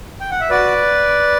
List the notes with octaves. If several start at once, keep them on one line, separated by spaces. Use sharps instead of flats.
G5
F#5
E5
F#4 B4 D5